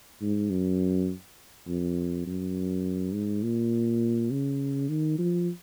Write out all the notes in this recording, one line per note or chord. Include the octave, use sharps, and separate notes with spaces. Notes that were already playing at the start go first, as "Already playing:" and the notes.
G#2
F#2
F2
F#2
G#2
A#2
C#3
D#3
F3